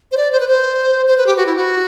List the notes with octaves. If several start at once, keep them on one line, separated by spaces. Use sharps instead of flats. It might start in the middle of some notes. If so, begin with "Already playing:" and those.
C5
D5
C5
B4
C5
C5
B4
G4
F#4
E4
F#4